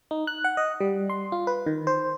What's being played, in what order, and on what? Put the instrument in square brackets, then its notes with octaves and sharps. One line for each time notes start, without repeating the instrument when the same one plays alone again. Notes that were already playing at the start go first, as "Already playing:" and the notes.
[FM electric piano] D#4
F#6
F#5
D#5
G3
C6
F4
B4
D#3
C5